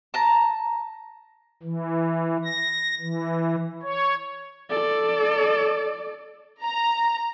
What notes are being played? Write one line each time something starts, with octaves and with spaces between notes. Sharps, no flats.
A5 A#5
E3
A#6
E3
C#5
A4 D5
A#5